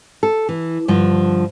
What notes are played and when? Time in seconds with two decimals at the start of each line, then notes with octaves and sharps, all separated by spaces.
0.23 A4
0.49 E3
0.88 G2 D3 F3